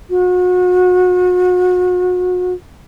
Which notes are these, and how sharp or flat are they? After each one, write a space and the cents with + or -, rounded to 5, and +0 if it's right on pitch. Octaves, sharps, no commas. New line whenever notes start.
F#4 -35